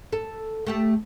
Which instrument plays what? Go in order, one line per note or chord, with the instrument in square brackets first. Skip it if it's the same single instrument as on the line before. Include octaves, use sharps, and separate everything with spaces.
[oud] A4
A3 G4 A4